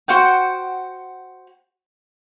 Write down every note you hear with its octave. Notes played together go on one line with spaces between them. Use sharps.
F#4 C5 F#5 G5